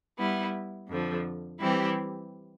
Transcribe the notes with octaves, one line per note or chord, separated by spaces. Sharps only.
G3 B3 E4
F2 D3 F3
E3 G3 C4 E4 G4